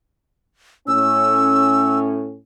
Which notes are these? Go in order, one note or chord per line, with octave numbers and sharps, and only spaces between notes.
A2 C#4 E6